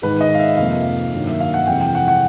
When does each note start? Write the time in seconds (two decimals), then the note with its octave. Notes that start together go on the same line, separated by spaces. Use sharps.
0.02 G#2 D#3 G#3 B4
0.21 D#5
0.34 F5
0.39 E5
0.57 F2 C3 F3 A#3 F5
1.13 G2 D#3 F#3 A#3
1.27 E5
1.40 F5
1.54 F#5
1.67 F2 C3 E3 G#3 G5
1.81 G5
1.95 F#5
2.08 F#5